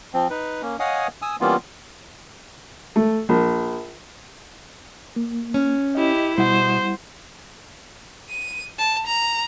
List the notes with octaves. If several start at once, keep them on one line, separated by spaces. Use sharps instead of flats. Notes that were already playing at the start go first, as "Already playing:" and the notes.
F3 C4
D#4 B4
A#3 C#4
C#5 D#5 F5 F#5 G#5 D#6
G#5 D#6 E6
E3 G3 A#3 B3 C#4 F4
A3
A#1
A#3
C#4
E4 G4 D#5
B2 G3 E4 C5 F#5
D#7
A5
A#5